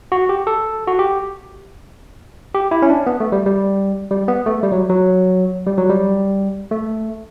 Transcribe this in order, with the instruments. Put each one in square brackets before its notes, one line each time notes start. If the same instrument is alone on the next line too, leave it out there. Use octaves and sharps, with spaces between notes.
[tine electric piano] F#4
G4
A4
F#4
G4
G4
E4
C#4
D4
B3
A3
G3
G3
G3
B3
A3
G3
F#3
F#3
G3
F#3
G3
A3